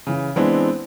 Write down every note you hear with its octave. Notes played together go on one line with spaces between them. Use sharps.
C#3 E3
E3 G#3 B3 C4 D4 E4